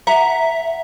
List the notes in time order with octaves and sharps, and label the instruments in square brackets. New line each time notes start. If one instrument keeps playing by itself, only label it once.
[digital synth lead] E5 [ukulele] F#5 A#5